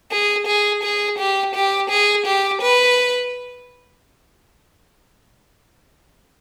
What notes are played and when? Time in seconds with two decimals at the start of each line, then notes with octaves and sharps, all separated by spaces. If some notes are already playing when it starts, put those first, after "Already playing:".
0.11 G#4
0.47 G#4
0.83 G#4
1.18 G4
1.55 G4
1.90 G#4
2.26 G4
2.62 B4